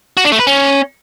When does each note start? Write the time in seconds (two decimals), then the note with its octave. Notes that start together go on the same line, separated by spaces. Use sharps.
0.17 F#4
0.25 D4
0.32 A3
0.39 B4
0.47 C#4